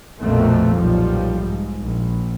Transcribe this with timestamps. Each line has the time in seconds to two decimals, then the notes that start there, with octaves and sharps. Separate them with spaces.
0.22 A#1 F2 B2 A3 A#3 C4
0.77 B1 A#2 F3 G3
1.44 G#2
1.82 A#1